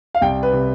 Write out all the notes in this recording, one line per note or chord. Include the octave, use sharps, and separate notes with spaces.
F5
C2 G5
B4
C3